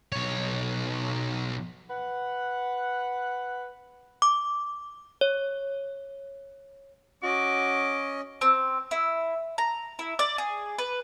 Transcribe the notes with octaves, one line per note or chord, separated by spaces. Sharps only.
B1 C#5
B4 F#5
D6
C#5
C#4 F#4 D#5 D6
C4
E4
A#5
E4
D5
G#4
B4